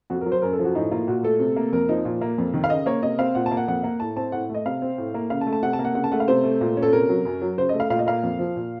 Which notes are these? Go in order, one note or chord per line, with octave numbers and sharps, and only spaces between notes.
F2 F#4
A#4
F#3
C5
F#2 A#4
A4
F3
F#4
A2 D#4
A#3 F4
A#2 F#4
A3 A4
C3
A#3
F2 A#4
F3 D#4
A#2
A#3
F2
D#3
F5
C#3 D#5
A#3 C#5
C3 D#5
C4 F5
A#2 F#5
A5
A#3
F#5
F2 F#5
A#3
A2 A5
C4 A5
A2 F#5
A3 D#5
C3 F5
C4
A2
A#3
C#3 F5
A5
A3
A5
C3 F#5
A5
A#3
F#5
C#3 F#5
A5
A3 F#5
F5
C3 C5
A3
A#2
C#4
A4
C3 A#4
F#3
F#2
F#3
C#3 C5
A3 D#5
F5
A#2 F5
D#5
A#3 F5
F2
F3
A#2